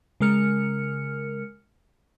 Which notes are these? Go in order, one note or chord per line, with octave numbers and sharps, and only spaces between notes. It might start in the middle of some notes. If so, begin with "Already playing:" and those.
C#3 G#3 A#4 F6 C#7